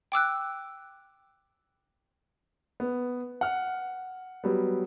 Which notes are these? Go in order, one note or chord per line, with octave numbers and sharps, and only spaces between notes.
G5 D6 E6 F#6
B3
F#5 F6
F#3 G3 B3